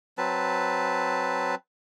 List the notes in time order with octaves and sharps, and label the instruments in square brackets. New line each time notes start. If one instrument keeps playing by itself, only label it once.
[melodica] F#3 C4 B4 A5